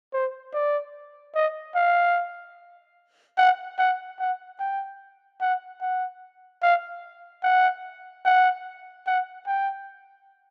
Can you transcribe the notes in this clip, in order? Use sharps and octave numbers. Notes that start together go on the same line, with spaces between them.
C5
D5
D#5
F5
F#5
F#5
F#5
G5
F#5
F#5
F5
F#5
F#5
F#5
G5